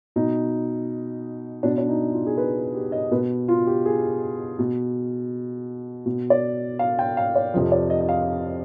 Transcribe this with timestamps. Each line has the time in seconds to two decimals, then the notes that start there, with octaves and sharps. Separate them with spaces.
0.16 B2 D#4
1.63 B2 D4
1.78 D4
1.88 D#4
2.13 F4
2.27 G#4
2.37 B4
2.75 G4
2.92 D#5
3.11 B2 B4
3.48 F4
3.67 G4
3.85 G#4
4.59 B2
6.06 B2
6.30 D5
6.79 F5
6.99 G5
7.17 F5
7.36 D5
7.54 F2 C3 F3
7.72 D5
7.90 D#5
8.01 D#5
8.09 F5